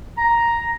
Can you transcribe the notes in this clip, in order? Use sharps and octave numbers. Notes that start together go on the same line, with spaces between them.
A#5